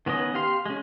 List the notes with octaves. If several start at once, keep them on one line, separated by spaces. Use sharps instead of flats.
D#3 B3 C#4 D#5
G4 F5 C6
G#3 C#4